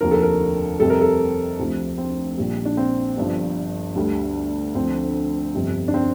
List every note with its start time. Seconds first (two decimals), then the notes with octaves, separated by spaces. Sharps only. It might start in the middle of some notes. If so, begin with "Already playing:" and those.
0.01 F1 D#2 D3 F3 A#4
0.11 A4
0.22 A#4
0.79 F2 C3 G3 A4
0.90 A#4
1.01 A4
1.59 D2 C3 F3
1.98 C4
2.37 A#1 A#2 G3
2.65 D4
2.77 C4
3.17 G1 G2 F3
3.96 D2 D3 G3
4.74 D2 D3 F3 C4
5.55 G1 F2 C3 G3
5.88 D4
5.94 C4